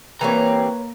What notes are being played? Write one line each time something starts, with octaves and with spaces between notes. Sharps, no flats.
E3 G3 A#3 C4 B4 C#5 A#5